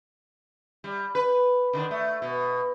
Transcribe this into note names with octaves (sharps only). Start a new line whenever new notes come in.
G3
B4
D3 D#3 D4
A3
B2